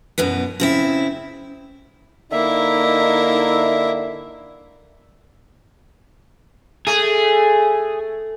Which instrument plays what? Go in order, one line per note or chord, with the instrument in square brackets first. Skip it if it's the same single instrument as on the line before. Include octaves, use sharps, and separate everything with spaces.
[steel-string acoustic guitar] F#2 B2 E3 B3
C#3 C4 E4
[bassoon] D3 [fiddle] A#3 E4 [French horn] D#4 [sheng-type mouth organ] E5
[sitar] A3 [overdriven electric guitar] G#4